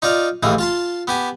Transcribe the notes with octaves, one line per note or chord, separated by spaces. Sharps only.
D#4 F4 D5 F5
A1 D#2 E3 A#3 G#4
F4 A5 C6
B3 G4 G#5